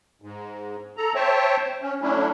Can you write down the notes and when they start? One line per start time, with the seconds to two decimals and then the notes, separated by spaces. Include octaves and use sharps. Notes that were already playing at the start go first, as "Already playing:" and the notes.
0.22 G#2
0.97 A4 A#5
1.15 C5 C#5 E5 G5 A5
1.82 C#4
2.02 F#3 A3 C#4 D4 E4